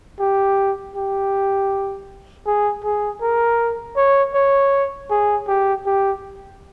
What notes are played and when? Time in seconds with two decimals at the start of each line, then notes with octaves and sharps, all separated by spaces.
0.20 G4
0.95 G4
2.46 G#4
2.84 G#4
3.22 A#4
3.97 C#5
4.34 C#5
5.10 G#4
5.48 G4
5.86 G4